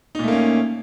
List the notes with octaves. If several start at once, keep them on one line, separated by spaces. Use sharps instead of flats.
A#2 A3 A#3 C#4 D#4